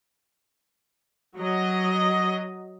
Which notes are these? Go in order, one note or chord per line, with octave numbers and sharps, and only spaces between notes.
F#3 D#5